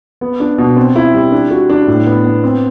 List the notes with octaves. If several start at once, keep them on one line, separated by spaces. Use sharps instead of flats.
B3
D4
B2
C4
E4
G3
D4
F#4
D4
A2
B3
B3
C4